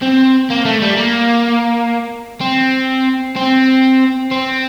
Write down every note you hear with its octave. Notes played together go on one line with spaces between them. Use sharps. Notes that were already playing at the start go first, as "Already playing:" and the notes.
C4
A#3
A3
G3
A#3
C4
C4
C4